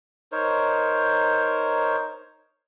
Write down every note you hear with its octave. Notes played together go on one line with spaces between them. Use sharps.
D#4 A#4 C5 C#5